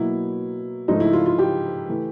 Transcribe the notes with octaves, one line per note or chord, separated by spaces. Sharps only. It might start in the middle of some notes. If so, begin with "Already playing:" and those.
Already playing: B2 F#3 A#3 E4
G#2 F3 A3 D#4
E4
F4
F4
G4
E3 A3